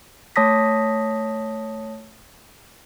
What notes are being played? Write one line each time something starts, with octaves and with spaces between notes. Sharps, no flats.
A3 C#5 A5 D#6 A#6 B6